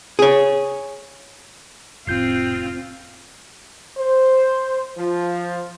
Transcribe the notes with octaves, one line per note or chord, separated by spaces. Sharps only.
G#4 C#5
F1 A2 C4 F4 G6 C7
C5
F3